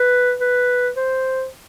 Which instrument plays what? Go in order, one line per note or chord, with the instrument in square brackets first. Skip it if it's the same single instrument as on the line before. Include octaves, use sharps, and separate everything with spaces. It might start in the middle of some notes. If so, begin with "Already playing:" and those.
Already playing: [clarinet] B4
B4
C5